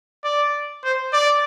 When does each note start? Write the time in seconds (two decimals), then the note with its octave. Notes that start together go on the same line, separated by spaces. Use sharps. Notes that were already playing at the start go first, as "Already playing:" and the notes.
0.24 D5
0.84 C5
1.13 D5